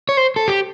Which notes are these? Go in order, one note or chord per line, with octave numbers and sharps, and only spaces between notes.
C#5
C5
A4
G4